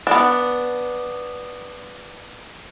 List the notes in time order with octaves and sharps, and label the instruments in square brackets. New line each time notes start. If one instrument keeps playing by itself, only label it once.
[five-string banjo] B3 D4